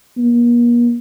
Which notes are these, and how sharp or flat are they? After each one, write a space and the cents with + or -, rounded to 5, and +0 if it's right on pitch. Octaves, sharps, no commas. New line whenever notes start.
A#3 +40